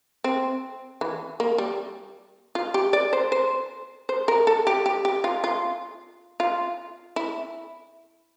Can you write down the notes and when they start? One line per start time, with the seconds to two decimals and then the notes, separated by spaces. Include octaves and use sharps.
0.24 C4
1.01 E3
1.40 A#3
1.58 G3
2.55 F4
2.74 G4
2.93 D5
3.13 C5
3.32 C5
4.09 C5
4.28 A#4
4.47 A4
4.67 G4
4.86 G4
5.05 G4
5.24 F4
5.44 F4
6.40 F4
7.16 E4